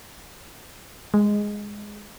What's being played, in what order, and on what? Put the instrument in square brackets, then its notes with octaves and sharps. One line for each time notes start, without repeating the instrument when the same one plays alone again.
[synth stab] G#3